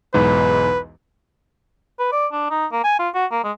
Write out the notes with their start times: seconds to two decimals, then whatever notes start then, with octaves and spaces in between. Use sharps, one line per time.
0.14 B1 E2 G#2 B4
1.99 B4
2.12 D5
2.32 D4
2.50 D#4
2.72 A#3
2.84 G#5
2.99 F4
3.14 F#4
3.31 A#3
3.44 G#3